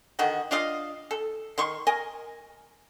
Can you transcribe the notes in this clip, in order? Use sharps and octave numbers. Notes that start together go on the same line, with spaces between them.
D3 D#3 F#4 D#5
D4 F4 D#5 F5
A4
D#3 C6 C#6
A#4 D#5 G#5